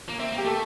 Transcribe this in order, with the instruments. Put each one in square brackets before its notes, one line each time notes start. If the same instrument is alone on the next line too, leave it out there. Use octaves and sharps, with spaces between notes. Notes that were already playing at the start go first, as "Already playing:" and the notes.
[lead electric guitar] A#3
[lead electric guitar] C4 [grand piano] E5
[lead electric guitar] A#3
[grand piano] G4
[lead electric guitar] A3 [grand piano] A4